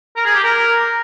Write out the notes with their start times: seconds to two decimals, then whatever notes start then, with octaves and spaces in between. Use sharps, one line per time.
0.17 A#4
0.26 G#4
0.35 G4
0.44 A#4